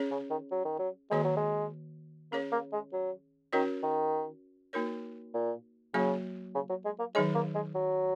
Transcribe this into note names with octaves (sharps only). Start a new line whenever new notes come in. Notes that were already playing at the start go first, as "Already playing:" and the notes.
Already playing: C#4 G#4 C#5
C#3
D#3
F#3
D#3
F#3
D#3 G#3 A#3 F#4 C#5
F#3
G#3
A#3 C#4 G#4 C#5
A#3
G#3
F#3
D#3 C#4 F#4 A#4 C#5
D#3
A#3 D#4 F#4 A#4 C#5
A#2
C#3 F#3 A#3 F#4 C#5
C#3
F#3
G#3
A#3
D#3 F#3 G#3 D#4 G#4 C#5
A#3
G#3
F#3